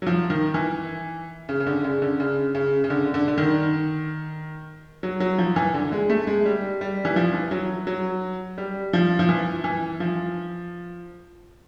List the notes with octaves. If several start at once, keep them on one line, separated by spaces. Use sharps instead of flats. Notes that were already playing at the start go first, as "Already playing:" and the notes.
F#3
F3
D#3
E3
C#3
C#3
D3
C#3
D3
C#3
C#3
C#3
D3
D3
D3
D#3
F#3
F#3
F3
E3
D3
G#3
A3
G#3
G3
G3
E3
F3
E3
F#3
F#3
G3
F3
F3
E3
E3
F3